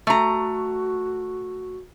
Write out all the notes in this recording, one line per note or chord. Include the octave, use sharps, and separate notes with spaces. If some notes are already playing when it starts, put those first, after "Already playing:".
A3 F#4 A#5